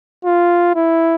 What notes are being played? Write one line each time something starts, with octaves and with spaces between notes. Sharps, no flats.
F4
E4